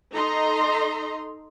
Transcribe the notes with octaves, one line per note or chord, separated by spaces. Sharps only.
D#4 A4 D#5 A#5 C6